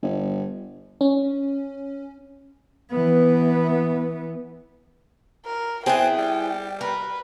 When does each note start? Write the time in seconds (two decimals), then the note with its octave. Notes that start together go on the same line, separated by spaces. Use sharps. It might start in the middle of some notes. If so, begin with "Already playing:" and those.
0.02 G1
1.01 C#4
2.92 E3 B3
5.45 A#4
5.86 B3 C4 E4 G#4 G5
6.18 G3
6.81 A#4 B4